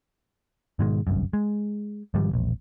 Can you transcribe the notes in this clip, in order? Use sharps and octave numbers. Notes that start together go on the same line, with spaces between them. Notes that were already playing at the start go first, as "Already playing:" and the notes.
G#2 B2 D#3 G#3
G1 C2 F#2
G#3
G#2 D#3 F3 G3
E1 A#1